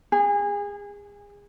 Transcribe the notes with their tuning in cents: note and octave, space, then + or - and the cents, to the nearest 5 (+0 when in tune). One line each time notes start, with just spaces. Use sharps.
G#4 -30